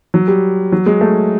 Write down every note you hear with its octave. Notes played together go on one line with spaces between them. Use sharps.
F#3
G3
F#3
G#3
A3